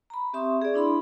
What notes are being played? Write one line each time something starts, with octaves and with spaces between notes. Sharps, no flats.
A#5 B5
C4 G4 E5 C6 C#6 D#6
G#4 D5
D4 E4 B5 C6